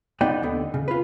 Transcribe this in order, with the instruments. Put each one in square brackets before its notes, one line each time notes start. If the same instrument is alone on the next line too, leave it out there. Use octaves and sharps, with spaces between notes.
[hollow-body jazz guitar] B3 D#4 D5 D#5 F#5 G5
D#2 D3 B3
C#3
F4 B4